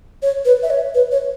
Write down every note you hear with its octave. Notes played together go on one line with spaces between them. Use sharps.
C#5
B4
E5
C#5
B4
C#5